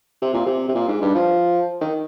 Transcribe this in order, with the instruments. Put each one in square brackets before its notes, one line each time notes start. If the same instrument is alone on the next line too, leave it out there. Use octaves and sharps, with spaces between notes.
[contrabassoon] C3
A#2
C3
C3
A#2
G#2
G2
F3
D#3